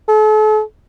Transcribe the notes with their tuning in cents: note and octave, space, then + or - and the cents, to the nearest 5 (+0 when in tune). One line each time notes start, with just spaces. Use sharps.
A4 -40